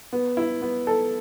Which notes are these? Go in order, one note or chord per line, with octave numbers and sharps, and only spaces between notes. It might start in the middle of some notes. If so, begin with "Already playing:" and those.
B3
E4
B3
A4